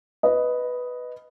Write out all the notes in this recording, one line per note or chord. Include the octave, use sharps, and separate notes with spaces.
B4 D#5